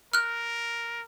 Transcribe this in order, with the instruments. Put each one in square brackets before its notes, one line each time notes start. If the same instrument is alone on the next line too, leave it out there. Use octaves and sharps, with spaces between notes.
[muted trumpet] A#4 [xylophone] F6 F#6